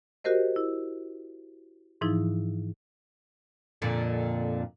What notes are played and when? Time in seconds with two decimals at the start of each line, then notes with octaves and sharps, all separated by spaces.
0.24 F#4 G4 A#4 C5 D#5
0.56 E4
2.01 G#2 E3 F3 D#4 E4
3.82 F2 A#2 D3